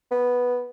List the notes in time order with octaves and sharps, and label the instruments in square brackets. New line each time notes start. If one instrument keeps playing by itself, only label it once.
[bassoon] B3